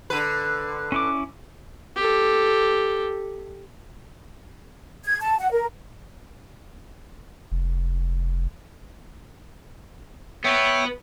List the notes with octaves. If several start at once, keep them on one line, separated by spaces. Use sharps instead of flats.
D3 B4
C#4 E4 D6
G4 A4
G#6
A5
F#5
A#4
F1
B3 B4 C#5 E5 G5